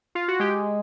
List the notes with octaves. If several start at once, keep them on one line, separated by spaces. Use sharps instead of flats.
F4
F#4
G#3 G4